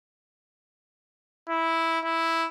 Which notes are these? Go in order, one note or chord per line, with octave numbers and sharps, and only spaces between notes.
E4
E4